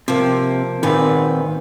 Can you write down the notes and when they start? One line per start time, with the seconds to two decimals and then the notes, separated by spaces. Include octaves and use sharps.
0.08 C3 F3 A#3
0.83 A#2 D#3 C4 B4